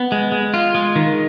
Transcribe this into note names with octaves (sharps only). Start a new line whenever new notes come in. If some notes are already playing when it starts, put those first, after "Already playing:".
Already playing: B3
G#3
G#3
F4
G#3
D#3